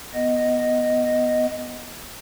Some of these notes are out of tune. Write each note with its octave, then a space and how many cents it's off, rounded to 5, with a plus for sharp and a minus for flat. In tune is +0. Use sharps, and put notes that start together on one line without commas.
B3 +0 D#5 +0